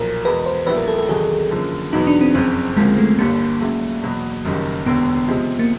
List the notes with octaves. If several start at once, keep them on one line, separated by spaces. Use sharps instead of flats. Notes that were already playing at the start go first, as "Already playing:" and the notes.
Already playing: B1 A#2 F3 A#4
E2 B2 G#3 B4
C5
A#1 A#2 G3 B3 E4 B4
A#4
A4
A4
E2 C3 D#3 F#3 G#4
F#2 D3 F3 A#3
E2 B2 F#3 B3 D#4
D4
C4
F#1 F2 C#3 C4
D2 C#3 F3 G#3 A#3
A3
G1 G2 D3 G3 A#3
C#2 C#3 F#3 A3
E2 B2 F#3
F#1 F#2 D#3 G3 A#3
E1 D#2 D3 B3
C3 F3 G#3
A#3